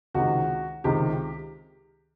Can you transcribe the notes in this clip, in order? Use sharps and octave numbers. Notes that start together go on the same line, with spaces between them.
C#2 C3 D#3 F#4
C#2 C3 D#3 G4